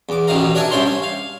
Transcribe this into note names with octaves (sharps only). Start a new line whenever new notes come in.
E2 D6
A1 B2 D#3 F5 A#5
D4 A#4 D5 E5 G#5 A5
C2 G2 C#4 E4 C5 C6
G#5
F5